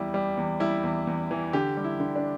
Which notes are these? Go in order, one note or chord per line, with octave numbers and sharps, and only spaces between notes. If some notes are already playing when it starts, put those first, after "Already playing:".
Already playing: E2 G3 E4
G3
E2
G3 E4
E2
E2
E3
D3 G4
G3
E4
D3
D4